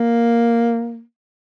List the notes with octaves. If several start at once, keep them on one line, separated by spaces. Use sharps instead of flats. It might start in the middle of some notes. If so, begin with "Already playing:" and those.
Already playing: A#3